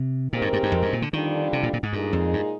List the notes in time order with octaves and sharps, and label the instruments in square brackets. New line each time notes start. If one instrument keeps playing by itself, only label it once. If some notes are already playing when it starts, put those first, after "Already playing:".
Already playing: [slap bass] C3
[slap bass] A#2 [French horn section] D#3 G#3 C4 G4 A#4
[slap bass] G2
G2
G2
F2
G2
A#2
D3
[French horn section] F2 D3 G3 D4 F4 [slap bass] D#3
[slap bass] C3
A#2
A#2
G#2
[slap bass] G2 [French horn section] A#2 G#3 D#4 G#4
[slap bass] F2
G2